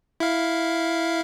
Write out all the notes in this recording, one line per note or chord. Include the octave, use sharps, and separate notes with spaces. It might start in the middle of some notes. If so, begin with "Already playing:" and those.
E4 F5